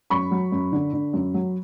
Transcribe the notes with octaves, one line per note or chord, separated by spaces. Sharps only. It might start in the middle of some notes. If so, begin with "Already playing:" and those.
F#2 B5 C#6
F#3
F#2
D3
D3
F#2
F#3